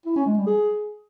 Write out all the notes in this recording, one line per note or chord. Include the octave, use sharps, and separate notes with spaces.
E4
C#4
G#3
G3
G#4